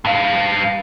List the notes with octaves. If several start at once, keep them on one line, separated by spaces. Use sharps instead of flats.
G2 F5